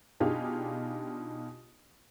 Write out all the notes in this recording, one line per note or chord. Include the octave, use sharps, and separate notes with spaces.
B2 D4 D#4 F4 G4 G#4